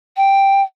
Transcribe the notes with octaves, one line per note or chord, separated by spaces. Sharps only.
G5